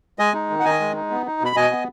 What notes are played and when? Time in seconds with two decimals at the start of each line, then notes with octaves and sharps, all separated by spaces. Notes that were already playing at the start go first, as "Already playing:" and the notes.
0.19 G#3 D#5 G#5
0.34 D#4
0.50 D#3
0.60 F#5
0.65 D#3 D#5 G#5
0.80 G#3
0.95 D#4
1.10 B3
1.26 D#4
1.41 B2 B5
1.56 B2 D#5 G#5
1.71 B3